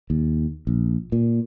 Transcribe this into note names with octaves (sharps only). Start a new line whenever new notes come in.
D#2
A#1
A#2